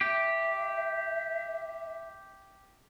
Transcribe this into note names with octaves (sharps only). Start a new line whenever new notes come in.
G4 E5